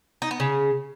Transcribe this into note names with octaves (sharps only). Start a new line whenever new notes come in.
D#4
B3
C#3